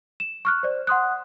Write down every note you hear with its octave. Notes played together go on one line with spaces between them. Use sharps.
E7
C#6 F6 F#6
C5 D5
F#5 C6 D#6 F#6